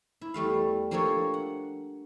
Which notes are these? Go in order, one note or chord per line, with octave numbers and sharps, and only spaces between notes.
E4
E2 G3 A3 F5
F3 A#3 D4 G4 A4 C#5
F#5